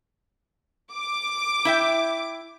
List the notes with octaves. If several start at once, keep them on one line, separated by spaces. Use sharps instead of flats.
D6
E4 E5 G5